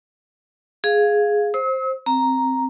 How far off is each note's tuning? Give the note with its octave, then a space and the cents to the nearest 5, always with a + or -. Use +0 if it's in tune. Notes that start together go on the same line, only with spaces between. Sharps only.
G#4 +5 F5 +0
C5 +10 E6 -45
C4 +0 A#5 +0